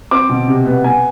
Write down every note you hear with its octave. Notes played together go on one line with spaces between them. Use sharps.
C4 D6
B2
C3
B3
B3 G#5